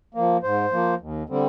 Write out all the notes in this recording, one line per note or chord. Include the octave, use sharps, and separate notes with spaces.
F3 A#3
G#2 C5
F3 A#3
D#2
D3 G3 C4